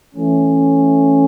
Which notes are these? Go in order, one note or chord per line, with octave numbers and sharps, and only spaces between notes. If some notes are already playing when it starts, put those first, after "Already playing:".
E3 A3 C#4